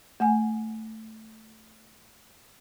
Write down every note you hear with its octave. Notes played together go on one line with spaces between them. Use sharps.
A3 F#5 G#5